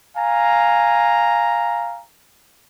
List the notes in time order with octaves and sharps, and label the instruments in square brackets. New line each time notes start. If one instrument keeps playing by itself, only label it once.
[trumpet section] F5 G#5 A#5